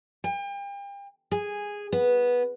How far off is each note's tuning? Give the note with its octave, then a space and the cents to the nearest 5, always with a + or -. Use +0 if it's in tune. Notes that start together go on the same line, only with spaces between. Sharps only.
G5 +40
G#4 -10
B3 -10